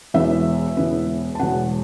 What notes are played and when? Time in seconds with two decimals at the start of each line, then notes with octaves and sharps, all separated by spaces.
0.14 E1 E2 E3 B3 E5
0.77 E1 E2 E3 B3
1.35 A5
1.40 E1 E2 B2 B3 F#5